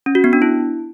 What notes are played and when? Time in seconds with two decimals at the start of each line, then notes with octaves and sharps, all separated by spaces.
0.06 C#4
0.15 F#4
0.24 B3
0.33 D4
0.42 E4